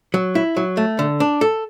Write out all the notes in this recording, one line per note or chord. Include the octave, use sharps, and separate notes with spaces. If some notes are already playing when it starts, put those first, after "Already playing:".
F#3
E4
F#3
A3
D3
D4
A4